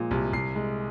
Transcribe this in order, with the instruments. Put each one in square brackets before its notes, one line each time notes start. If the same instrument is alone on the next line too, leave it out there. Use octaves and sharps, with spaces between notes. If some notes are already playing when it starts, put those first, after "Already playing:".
Already playing: [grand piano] A#2 F3 G#3
C2
C2 C7
G#3